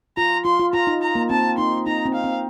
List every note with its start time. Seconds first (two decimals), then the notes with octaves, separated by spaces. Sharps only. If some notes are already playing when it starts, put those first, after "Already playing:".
0.17 F4 A#5
0.45 F4 C6
0.59 F4
0.73 F4 A#5
0.87 D#4
1.02 A#5
1.15 A#3
1.30 C4 A5
1.58 D#4 C6
1.87 D#4 A#5
2.06 C4
2.15 F5
2.24 C4